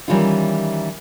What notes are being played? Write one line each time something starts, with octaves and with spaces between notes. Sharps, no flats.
D#3 E3 G3 C#4 E4 F4